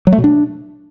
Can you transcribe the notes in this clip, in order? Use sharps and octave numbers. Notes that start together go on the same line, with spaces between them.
F#3
A3
B2
D4